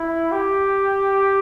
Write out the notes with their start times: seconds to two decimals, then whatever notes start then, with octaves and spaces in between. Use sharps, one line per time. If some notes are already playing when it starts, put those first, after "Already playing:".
Already playing: E4
0.32 G4